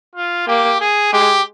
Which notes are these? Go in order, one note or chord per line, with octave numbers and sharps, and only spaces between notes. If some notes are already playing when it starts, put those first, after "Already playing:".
F4
A#3 G4
G#4
G#3 G4